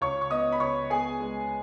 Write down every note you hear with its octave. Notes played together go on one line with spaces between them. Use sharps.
C#2 C#5 C#6
C#6
B3 D#5 D#6
B5
C#2 C#5 C#6
B3 G#4 G#5
G#3